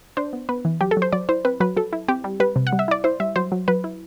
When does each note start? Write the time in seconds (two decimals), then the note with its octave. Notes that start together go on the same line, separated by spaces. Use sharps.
0.17 D4 C5
0.33 B3
0.49 B3 B4
0.65 E3
0.81 F#3 G4
0.91 A4
0.97 F#3
1.02 C5
1.12 F#3 D5
1.29 E4 C5
1.45 C4 B4
1.60 F#3 B4
1.77 F#3 A4
1.93 E4
2.08 C4 G4
2.24 G3
2.40 G3 B4
2.56 C3
2.67 F#5
2.73 G3
2.79 E5
2.88 E4 D5
3.04 E4 C5
3.20 G3 E5
3.36 F#3 C5
3.52 F#3
3.68 F#3 B4
3.84 E4